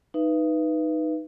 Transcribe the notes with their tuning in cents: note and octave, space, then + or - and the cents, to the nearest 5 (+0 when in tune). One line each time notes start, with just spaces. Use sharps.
D#4 +0 B4 +0 E5 +35